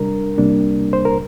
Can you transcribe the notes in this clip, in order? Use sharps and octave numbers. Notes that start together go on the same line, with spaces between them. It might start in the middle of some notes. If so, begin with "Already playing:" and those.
Already playing: C3 G3 D4 A#4
C2 C3 G3 A#3 D4
C5
A#4